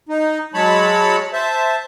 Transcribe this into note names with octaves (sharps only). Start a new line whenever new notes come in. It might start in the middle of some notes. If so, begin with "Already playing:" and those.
D#4
F#3 G#3 C#5 A5 B5
C5 E5 A5